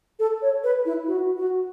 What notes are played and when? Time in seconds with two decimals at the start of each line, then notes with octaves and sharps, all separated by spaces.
0.19 A4
0.42 C#5
0.64 B4
0.86 E4
1.08 F#4
1.37 F#4